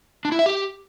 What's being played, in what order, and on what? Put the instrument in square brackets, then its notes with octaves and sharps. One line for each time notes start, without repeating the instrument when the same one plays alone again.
[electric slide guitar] D4
E4
E5
G4